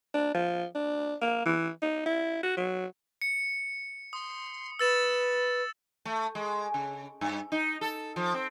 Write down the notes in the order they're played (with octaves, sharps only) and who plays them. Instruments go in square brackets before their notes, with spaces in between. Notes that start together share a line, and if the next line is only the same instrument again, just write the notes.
[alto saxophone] D4
F3
D4
A#3
E3
D#4
E4
F#4
F#3
[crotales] C#7
[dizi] C6 [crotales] D#6
[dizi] B4 [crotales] E6 A6 E7
[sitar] A3
G#3
C#3
G2
D#4
A4
F3
C4